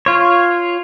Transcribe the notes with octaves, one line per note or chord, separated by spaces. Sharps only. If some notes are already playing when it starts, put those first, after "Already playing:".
F4 C#5